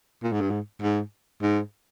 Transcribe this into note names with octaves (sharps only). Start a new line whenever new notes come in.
A#2
G#2
G2
G#2
G#2
G#2